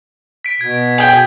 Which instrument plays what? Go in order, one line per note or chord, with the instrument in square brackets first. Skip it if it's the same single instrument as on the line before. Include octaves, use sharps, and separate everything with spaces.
[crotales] B6 D7
[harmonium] B2 [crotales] G#6
[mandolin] G#4 G5